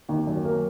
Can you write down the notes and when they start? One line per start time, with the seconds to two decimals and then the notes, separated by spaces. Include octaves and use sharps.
0.09 D#2
0.27 F#2
0.45 A#3